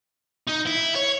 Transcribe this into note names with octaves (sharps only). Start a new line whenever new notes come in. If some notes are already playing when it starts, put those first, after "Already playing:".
D#4
E4
C#5